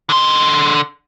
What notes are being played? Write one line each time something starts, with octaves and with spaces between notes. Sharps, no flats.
D3 C6